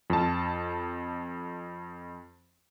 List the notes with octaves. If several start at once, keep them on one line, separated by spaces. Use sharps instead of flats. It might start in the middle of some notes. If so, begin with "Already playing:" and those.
F2 A5